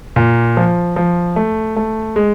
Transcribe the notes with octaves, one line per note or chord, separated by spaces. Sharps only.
A#2
F3
F3
A3
A3
G#3